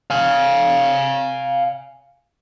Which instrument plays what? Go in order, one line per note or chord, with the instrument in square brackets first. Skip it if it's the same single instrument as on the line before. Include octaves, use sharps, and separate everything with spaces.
[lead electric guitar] F5 G#5